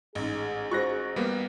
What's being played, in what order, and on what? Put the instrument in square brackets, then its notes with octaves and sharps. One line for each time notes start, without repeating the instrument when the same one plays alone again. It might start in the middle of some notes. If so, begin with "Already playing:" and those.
[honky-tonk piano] A1 G#2 [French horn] G#4
[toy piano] F4 F#4 C5 [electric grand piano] C#6 F#6 A#6
[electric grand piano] G3 A#3 B3